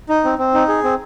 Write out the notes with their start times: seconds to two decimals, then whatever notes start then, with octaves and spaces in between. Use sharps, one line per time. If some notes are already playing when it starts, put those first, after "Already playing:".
0.09 D#4
0.24 C4
0.38 C4
0.54 D#4
0.68 G#4
0.84 C4